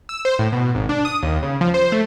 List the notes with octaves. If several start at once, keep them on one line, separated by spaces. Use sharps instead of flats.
E6
C5
A2
B2
G#1
D4
D#6
D#2
C#3
F3
C5
A3